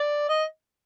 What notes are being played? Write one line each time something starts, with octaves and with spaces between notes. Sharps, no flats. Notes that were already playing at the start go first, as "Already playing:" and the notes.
Already playing: D5
D#5